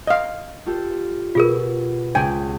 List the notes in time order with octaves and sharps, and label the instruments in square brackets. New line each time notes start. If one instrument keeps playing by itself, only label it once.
[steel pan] D#5 F5
[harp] F4 G4 A4
[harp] B2 [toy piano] F4 G#4 A#4
[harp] C#2 [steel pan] G5 G#5